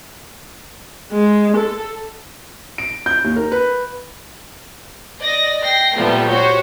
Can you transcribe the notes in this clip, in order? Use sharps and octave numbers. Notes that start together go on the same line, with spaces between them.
G#3
A4
D7
G6
D#2
A#4
B4
D5 D#5 A#6
G5 A#6 C7
A#2 F3 G3 A3 B3
F#4 G4 C5 C#5